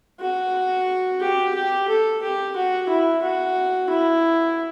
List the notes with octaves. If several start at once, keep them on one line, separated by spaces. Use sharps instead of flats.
F#4
G4
G4
A4
G4
F#4
E4
F#4
E4